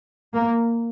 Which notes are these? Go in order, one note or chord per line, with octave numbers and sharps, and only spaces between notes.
A#3